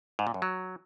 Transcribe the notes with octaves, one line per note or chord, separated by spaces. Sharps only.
G#2
A#2
F#2
F#3